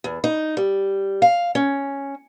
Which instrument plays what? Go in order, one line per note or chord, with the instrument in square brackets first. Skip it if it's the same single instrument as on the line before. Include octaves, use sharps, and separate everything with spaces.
[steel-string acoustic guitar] E2
D#4
G3
F5
C#4